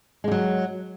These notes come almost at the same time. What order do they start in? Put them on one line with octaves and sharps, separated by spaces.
G#3 F3 F#3